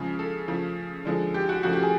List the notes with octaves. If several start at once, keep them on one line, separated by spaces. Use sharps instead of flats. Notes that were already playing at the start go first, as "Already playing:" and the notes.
Already playing: C#3 F3 G#3
A4
C#3 F3 A3
D3 F3 G#3
G4
F#4
C#3 F3 A3 F#4
G4
G#4